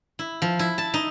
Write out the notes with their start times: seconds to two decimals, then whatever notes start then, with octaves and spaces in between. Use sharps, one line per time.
0.19 E4
0.42 F3
0.59 E4
0.78 A5
0.94 D#4